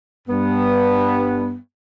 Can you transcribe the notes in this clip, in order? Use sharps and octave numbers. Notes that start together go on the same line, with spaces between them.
G2 B3